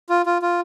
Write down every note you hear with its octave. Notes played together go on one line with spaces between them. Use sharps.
F4
F4
F4